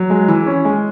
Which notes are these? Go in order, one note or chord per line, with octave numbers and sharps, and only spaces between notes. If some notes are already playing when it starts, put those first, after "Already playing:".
Already playing: F#3
G#3
E3
C#4
G#3